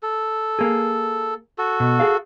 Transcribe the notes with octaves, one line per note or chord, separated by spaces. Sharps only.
A4
A#3 G#4
F#4 A4
B2
G#4 F5